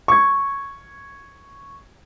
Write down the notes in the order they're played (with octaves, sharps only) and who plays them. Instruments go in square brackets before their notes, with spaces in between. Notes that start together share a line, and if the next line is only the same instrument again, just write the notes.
[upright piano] C#6 G#6